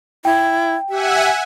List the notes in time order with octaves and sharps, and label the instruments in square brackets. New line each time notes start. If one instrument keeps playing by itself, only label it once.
[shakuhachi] E4 [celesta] G5
[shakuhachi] G4 [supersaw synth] E5 F#5 G#5